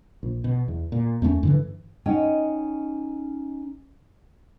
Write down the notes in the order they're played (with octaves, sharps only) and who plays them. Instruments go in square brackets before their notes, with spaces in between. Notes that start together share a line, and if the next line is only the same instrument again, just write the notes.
[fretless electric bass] A#1
B2
E2
A#2
E2 A3 A#3 C#4
G2 D3 E3
[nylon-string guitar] C#4 D#4 D#5 F#5 G5